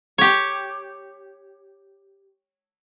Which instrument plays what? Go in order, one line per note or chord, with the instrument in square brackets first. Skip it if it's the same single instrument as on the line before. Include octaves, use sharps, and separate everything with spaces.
[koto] G4 C#5